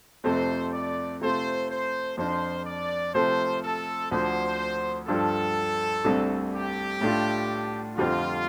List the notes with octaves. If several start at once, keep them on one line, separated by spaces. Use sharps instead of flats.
F2 C3 A3 C4 C5
D5
C3 A3 F4 C5
C5
F2 F3 D4 C5
D5
C3 F3 A3 C4 C5
A4
D2 D3 F3 C5
G2 F3 D4 F4 A4
C2 C3 A3 D4
G4
A2 A3 D4 F4
F2 D3 G3 C4 F4